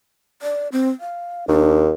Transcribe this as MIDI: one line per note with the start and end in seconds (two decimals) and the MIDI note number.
0.42 0.68 74
0.72 0.89 60
1.00 1.45 77
1.48 1.92 39
1.48 1.81 62